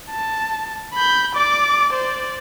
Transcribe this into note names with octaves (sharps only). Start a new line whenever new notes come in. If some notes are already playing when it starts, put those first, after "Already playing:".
A5
B5 G6
D5 D6
C5 D5